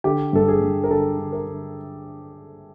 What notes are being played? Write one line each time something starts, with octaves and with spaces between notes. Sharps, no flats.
D3 G4
G2 A4
G#4
G2
A#4
D3 A4
D3
A#4
D3